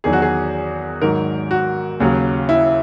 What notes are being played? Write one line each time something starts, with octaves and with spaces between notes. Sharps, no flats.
E2 D#3 F#3 G#4
F#4
G#4
G#2 D#3 F#3 A#4
F#4
D#2 C#3 F#3
E4